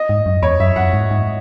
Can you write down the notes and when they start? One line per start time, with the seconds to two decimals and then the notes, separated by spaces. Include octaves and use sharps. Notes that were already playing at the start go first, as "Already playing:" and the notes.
Already playing: D#5
0.09 G#2
0.26 F#2
0.42 E2 C#5
0.60 F#2 E5
0.76 F#2 F#5
0.93 G#2
1.11 G#2